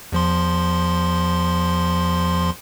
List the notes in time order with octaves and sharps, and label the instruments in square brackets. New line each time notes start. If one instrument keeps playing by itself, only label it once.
[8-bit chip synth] E2 F3 C6